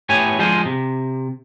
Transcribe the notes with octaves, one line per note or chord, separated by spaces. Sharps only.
A2 B3 G4 C#5 G#5
D3 F3 G#3 F4 G#4 C5
C3